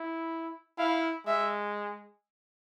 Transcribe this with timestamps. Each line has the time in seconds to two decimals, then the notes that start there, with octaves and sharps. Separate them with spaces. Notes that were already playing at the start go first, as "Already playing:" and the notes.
Already playing: E4
0.78 E4 F5
1.27 G#3 E5